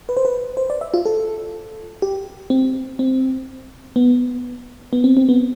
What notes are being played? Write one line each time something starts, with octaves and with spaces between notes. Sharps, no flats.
B4
C5
B4
C5
D5
E5
F4
A4
G4
C4
C4
B3
B3
C4
C4
B3